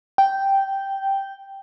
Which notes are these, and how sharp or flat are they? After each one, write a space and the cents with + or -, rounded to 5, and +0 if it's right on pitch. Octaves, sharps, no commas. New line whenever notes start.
G5 -5